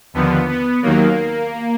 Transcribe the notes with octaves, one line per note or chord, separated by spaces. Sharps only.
D#2 D3 F3 B3
B3
D#2 D#3 F#3 A#3